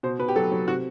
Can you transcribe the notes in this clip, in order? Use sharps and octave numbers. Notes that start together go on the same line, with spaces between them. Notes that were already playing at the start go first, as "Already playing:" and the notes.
B2 C5
B2 B4
G4
F#3 A4
F#3
C3 F#4